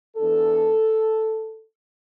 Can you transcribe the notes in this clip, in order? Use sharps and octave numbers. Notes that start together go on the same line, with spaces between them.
E2 E3 B3 D4 A4